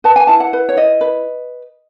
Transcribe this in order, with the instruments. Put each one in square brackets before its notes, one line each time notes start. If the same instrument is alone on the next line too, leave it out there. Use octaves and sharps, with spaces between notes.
[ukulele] B4 A5
G#5
E4 A5
F#5
B4
C#5
E4 D#5
B4